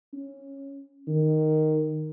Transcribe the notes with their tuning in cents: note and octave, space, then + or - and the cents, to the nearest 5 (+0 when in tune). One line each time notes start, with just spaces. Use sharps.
C#4 -10
D#3 -5